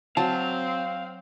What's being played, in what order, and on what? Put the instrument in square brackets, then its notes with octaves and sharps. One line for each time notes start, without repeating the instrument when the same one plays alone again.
[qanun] F#3 [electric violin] C4 [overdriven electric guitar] F5 [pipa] A5